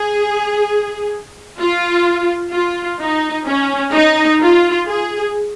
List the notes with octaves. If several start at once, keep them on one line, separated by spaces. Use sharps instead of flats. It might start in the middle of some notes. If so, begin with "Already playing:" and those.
Already playing: G#4
F4
F4
D#4
C#4
D#4
F4
G#4